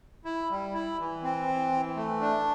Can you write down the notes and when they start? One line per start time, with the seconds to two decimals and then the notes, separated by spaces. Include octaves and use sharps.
0.25 E4
0.50 G3
0.74 E4
0.99 E3
1.23 C4
1.48 E3
1.72 E3
1.96 A3
2.21 D4